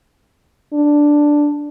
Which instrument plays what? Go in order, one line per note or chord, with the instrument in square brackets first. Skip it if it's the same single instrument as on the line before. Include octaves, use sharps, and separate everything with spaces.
[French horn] D4